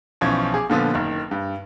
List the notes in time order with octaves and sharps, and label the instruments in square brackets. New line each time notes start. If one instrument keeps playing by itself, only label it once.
[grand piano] B1 E3 F3 C#4 C#6 G#6
G#4 D6
A#2 D3 F3 B3
F#1 D#3
G2